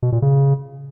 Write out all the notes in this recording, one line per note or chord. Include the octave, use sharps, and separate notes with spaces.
B2
A#2
C#3